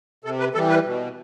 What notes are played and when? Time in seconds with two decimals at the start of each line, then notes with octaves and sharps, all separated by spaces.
0.24 C3 A4
0.40 B4
0.54 E3 G3 A4
0.70 B4
0.85 B2